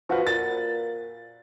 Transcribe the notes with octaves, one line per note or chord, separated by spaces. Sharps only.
F3 F#4 B4
A#2 A6